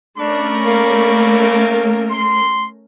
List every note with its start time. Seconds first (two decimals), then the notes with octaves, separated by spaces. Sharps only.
0.18 A3 C#4 D4 A#4 D5 B5 C#6
0.65 A#3
2.11 C6